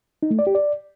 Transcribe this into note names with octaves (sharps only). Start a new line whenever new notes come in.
D#4
A3
D5
G4
D5